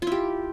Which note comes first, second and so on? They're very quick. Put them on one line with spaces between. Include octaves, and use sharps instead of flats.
F4 E4 G4